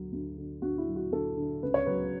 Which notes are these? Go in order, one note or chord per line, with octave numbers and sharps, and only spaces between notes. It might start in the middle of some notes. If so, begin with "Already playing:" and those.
Already playing: D2 F#3
D2
D3
D2 F#4
E4
F#3
F#4
D2 A4
D3
C#2 B4
C#5
F#3 B4